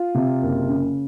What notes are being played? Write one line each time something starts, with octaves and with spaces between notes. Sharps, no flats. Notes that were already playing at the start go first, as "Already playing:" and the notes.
Already playing: F4
C3
F#1
C#3